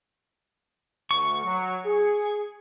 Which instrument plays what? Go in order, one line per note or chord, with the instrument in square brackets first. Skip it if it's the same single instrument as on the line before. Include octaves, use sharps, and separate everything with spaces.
[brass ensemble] D2 [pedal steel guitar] C#6
[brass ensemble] F#3
G#4